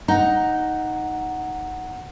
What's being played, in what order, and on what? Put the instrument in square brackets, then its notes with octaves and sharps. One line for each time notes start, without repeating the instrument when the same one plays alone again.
[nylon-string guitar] D#4 [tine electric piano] F#5 A#5